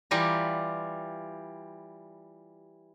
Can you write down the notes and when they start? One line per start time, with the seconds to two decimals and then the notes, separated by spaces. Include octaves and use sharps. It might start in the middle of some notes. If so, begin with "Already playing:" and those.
0.11 E3 G3 F4 G4 A#5